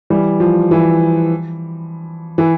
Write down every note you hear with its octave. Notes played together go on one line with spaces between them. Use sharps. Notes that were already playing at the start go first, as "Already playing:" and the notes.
E3 G3
F3
E3
E3